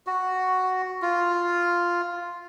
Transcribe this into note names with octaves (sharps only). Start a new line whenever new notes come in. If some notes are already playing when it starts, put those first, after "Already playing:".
F#4
F4